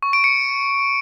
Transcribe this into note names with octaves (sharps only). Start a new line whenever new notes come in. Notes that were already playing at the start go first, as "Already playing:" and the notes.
C#6
D7
C#7